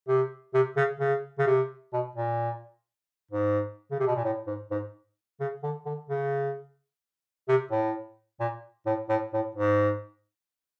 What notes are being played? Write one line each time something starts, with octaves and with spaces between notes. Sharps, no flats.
C3
C3
C#3
C#3
C#3
C3
B2
A#2
G#2
C#3
C3
B2
A#2
A2
G#2
G#2
C#3
D3
D3
C#3
C3
A2
A#2
A2
A2
A2
G#2